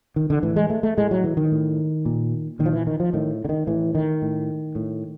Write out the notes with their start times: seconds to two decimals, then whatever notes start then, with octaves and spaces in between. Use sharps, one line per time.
0.16 D#3
0.30 D3
0.43 A2 E3
0.56 G#3
0.70 A3
0.83 A3
0.97 A2 G#3
1.11 F#3
1.24 E3
1.37 D#3
1.51 A2
2.06 A#2
2.59 A#2 D#3
2.66 F3
2.73 E3
2.87 D#3
3.00 F3
3.13 A2 D#3
3.45 D3
3.49 D#3
3.67 A2 E3
3.95 D#3
4.22 A2
4.75 A2